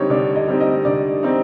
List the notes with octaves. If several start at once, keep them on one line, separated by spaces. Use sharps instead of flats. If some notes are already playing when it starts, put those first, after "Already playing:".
Already playing: D3 G3 C4 D#4 C#5
D3 D5
D#5
G3 C4 D#4
D#5
D3 D5
G3 C4 D#4